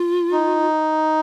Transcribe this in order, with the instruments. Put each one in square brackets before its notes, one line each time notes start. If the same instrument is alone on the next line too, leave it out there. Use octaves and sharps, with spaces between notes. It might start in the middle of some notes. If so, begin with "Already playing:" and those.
Already playing: [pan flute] F4
[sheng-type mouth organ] D#4